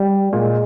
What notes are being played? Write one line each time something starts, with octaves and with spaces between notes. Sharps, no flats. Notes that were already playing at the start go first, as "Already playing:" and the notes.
Already playing: G3
A#2 G#3